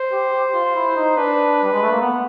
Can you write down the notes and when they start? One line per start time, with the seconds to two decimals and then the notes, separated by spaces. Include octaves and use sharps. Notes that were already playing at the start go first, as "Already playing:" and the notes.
Already playing: C5
0.12 G4
0.33 G4
0.54 F4
0.65 F4
0.75 E4
0.96 D#4
1.17 D4 B4
1.63 G3
1.73 G#3
1.82 A3
1.92 A#3
2.01 B3